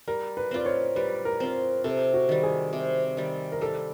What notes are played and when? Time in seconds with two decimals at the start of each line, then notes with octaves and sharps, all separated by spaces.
0.07 G3 A#4
0.37 B4
0.51 C4 F4 D5
0.66 C#5
0.96 G3 B4
1.25 A#4
1.40 C4 F4
1.84 C3 A4
2.14 F#4
2.29 D#3 G3
2.43 G#4
2.73 C3
3.17 D#3 G3
3.52 A#4
3.61 G3 A4